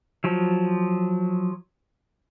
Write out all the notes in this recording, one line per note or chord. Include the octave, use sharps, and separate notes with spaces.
F3 F#3